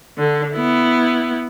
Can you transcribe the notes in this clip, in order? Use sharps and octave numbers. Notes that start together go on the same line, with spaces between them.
D3
B3 E4